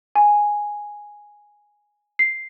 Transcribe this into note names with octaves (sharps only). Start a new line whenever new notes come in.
G#5
C7